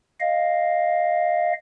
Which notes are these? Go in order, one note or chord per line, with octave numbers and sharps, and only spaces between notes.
D#5 F5